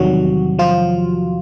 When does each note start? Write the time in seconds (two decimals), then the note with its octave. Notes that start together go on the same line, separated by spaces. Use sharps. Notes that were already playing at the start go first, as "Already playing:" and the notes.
Already playing: E2 C3 D#3 F#3 G3 F#4
0.59 F3 F4